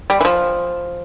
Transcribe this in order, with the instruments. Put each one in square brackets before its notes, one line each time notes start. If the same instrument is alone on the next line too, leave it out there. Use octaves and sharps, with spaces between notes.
[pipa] G3
E3
F3